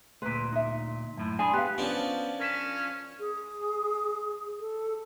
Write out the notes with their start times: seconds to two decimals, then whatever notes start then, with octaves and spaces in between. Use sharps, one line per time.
0.22 D2 A#2 B4 C6 B6
0.52 D#4 E5
1.17 F#2 A2
1.39 D4 G#4 G#5 B5 C6 D#6
1.53 B3 G4 F5 F#6
1.78 F3 B3 C#4 D4
2.39 C#4 A#4 B6 E7
3.20 G#4
4.60 A4